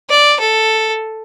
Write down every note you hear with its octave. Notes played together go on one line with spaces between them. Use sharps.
D5
A4